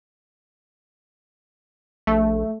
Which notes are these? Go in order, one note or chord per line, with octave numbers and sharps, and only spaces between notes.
A#1 A3